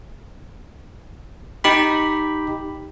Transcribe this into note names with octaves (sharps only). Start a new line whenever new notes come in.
D#4 G4 B5